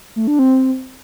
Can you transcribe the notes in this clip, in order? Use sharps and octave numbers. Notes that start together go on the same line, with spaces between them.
A3
D4
C4